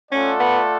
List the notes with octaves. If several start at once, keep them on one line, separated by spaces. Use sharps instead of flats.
A3 C#4 F4 A4 D5 F#5
B3